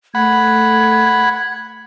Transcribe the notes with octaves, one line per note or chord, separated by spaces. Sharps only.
A3 F#5 B5 G#6